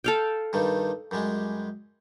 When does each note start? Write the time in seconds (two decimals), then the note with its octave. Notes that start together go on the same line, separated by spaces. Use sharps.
0.04 A4 F5 G5
0.53 G2 D#3 G3
1.11 F#2 G3 G#3